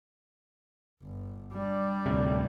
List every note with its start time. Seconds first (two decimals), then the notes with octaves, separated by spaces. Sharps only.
1.03 G1
1.53 G3 D4
2.06 D2 A2 C3